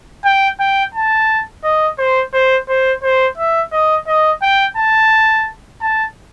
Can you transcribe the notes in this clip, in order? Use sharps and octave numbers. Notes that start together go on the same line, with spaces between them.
G5
G5
A5
D#5
C5
C5
C5
C5
E5
D#5
D#5
G5
A5
A5